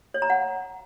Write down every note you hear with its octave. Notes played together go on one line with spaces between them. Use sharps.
C#5
A#5
F#5